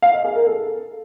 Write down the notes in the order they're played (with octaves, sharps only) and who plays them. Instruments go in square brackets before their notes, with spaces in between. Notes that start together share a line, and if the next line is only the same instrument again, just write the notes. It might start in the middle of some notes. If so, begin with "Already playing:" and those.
[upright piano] F5
D#5
G#4
A#4
A4